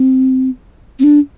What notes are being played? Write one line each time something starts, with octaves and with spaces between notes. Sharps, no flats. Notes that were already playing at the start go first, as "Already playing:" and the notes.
Already playing: C4
C4
D4